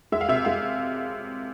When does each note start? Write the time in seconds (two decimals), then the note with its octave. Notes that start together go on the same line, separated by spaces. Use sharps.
0.12 G#3 E5
0.21 F5
0.28 C3 E5
0.45 G#3 F5